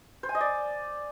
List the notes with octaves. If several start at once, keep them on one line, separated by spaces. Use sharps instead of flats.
C5
G#5
D#5
D5